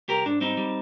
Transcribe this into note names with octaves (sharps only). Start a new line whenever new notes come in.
C2 G4 A#4
G#2 D4
G3 C4 D#4
G3